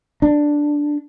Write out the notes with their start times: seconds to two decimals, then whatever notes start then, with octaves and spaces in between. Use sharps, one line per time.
0.22 D4